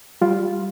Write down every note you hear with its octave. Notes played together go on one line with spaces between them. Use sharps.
G3 F4